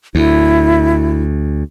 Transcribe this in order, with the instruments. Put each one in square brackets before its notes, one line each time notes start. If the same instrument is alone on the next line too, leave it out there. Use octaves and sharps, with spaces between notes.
[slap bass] D2 [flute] E4